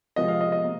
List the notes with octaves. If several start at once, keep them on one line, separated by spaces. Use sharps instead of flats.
C3 F3 G#3 D#5
F5
D#5
D#5
A#3